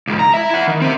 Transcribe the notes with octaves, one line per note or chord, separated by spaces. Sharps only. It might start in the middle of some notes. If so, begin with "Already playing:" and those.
C#2 G#2
A#5
E4 E5
E4 F#5
D#3
C4 E5